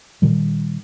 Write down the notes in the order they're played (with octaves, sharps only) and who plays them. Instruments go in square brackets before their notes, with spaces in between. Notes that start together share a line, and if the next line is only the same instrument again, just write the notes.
[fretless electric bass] A#2 D#3 G3